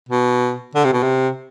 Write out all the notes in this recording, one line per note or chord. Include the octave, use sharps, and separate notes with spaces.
B2
D3
C3
B2
C3